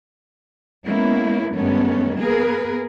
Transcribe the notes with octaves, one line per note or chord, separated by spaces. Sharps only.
G#3 A#3 B3 C#4 E4
G2 D#3 G#3 A3 B3 C#4
A#3 B3 G#4 A#4 B4